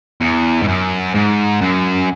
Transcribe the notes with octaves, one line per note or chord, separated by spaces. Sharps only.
E2
G#2
F#2
G#2
F#2